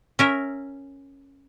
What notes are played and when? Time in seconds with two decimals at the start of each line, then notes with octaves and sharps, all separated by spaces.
0.19 C#4 A#4 E5